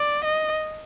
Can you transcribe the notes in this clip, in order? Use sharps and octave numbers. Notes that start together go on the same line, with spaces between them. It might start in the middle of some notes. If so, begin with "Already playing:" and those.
Already playing: D5
D#5